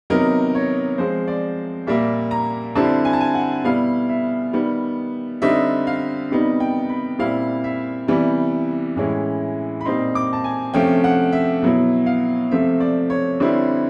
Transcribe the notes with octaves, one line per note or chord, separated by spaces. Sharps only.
C3 D#3 F#3 B3 D#4 A#4
C#5
F3 G#3 C4 C5
D5
A#2 G3 A#3 E5
A#5
D3 G3 C4 E4 A5
G#5
A5
G#5
F#5
B2 G3 B3 E4 F5
E5
D#3 G3 B3
D3 G3 C4 D#4 E5
F5
C3 D#3 G3 B3 D#4
G5
B5
A#2 G3 C4 E4 F5
E5
C3 E3 G3 B3
A2 E3 G#3 C#4 E4
B5
A#2 G3 C4 D#4 C6
D6
A5
G#5
C3 F3 A3 C#4 G5
F#5
E5
B2 F#3 B3 E4
F5
C3 F3 A3 C4 E5
D5
C#5
D3 G3 C4 E4